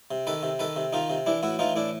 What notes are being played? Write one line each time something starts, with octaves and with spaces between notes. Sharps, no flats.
C3
D#3 A4 B4
C3
D#3 A4 B4
C3
D#3 D#4 F4
C3
E3 D4 E4
A2 E4 F#4
E3 D#4 F4
A2 D4 E4